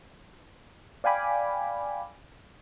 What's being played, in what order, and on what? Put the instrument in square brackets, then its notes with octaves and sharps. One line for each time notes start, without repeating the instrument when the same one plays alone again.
[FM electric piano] D5 F5 G5 G#5 B5 D6